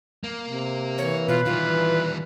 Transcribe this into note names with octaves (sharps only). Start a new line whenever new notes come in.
A#3
C3
E3 C#5
B2 F4 B4
D#3 E3 G3 F4